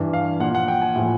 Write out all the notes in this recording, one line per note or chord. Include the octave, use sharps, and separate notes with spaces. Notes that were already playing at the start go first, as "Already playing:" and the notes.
Already playing: G2 E3
F5
A#2 F3 F#5
F#5
G5
G#5
A2 F3